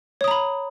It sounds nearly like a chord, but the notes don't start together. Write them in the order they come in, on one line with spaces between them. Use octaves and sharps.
C#5 D#6 A#5 B5